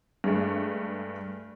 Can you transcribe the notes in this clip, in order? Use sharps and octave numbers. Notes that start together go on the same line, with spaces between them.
G2 G#3 A3